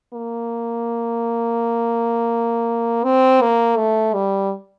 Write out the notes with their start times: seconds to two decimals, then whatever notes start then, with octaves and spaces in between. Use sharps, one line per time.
0.13 A#3
3.04 C4
3.42 A#3
3.77 A3
4.14 G3